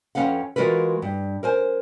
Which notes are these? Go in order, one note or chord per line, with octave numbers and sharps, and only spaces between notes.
F2 G#2 C#4 B4 F5 F#5
E3 G#3 F4 F#4 A#4 B4
G2
A#4 C5 G#5